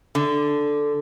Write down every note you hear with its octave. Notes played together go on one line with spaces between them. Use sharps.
D3